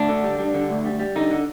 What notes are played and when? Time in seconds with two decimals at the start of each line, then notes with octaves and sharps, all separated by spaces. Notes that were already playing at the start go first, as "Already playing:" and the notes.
Already playing: D2 D4
0.09 D3
0.24 G3
0.39 G3
0.54 D3
0.70 D2
0.85 G3
0.99 G3
1.16 D3 D#4
1.31 D3